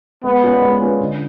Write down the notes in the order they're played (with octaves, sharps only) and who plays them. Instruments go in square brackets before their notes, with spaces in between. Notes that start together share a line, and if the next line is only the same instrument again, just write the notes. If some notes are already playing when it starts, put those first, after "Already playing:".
[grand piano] G#3 [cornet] B3
[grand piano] C#4 F4 B4 D5
G#3
C#4 F4 B4 D5
D3